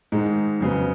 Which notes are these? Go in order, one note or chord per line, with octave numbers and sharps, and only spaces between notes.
G#2 D#3 G#3
F2 C#3 F#3 B3